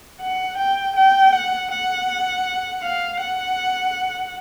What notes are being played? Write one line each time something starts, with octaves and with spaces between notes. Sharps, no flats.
F#5
G5
G5
F#5
F#5
F5
F#5